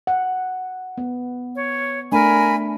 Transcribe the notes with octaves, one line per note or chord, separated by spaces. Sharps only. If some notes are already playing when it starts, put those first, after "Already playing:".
F#5
B3
C#5
A3 D4 A#4 G#5 B5